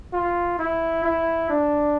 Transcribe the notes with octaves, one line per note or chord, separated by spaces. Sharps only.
F4
E4
E4
D4